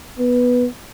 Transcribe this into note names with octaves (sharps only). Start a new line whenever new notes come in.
B3